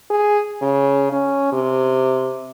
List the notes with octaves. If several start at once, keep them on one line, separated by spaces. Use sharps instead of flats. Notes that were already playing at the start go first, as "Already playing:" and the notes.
G#4
C#3
C#4
C3